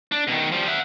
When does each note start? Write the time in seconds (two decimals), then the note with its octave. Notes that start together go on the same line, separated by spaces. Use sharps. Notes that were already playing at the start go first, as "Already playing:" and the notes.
0.12 D4
0.27 B2 D#3
0.52 F3 G3
0.68 E5 F#5